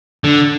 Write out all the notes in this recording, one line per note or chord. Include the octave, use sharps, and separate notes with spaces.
D3